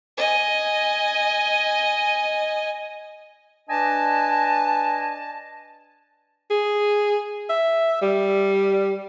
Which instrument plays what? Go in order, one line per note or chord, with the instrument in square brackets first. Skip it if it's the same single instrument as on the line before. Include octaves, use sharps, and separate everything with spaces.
[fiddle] D#5 G#5
[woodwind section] D4 B4 D5 D#5 G#5 A5
[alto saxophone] G#4
E5
G3